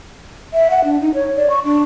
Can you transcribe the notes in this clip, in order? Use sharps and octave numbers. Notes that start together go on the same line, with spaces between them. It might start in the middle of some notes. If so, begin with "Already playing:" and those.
E5
F#5
D4
D#4
C#5
D5
C#6
D4